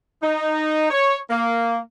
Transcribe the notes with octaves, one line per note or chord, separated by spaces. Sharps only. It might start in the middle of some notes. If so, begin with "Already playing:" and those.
D#4
C#5
A#3